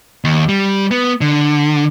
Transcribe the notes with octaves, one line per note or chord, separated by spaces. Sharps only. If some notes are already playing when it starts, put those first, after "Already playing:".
D#2
G3
B3
D3